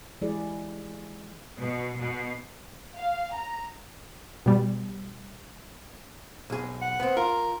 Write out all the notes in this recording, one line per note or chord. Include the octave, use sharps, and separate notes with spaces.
E3 G#3 E4 G4 G#4 D5
B2
B2
F5
A#5
B2 G3
B1 G#4
F#5
B3 C4
F4 A#4